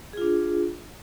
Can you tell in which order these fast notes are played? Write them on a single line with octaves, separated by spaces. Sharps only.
G#4 F4 D4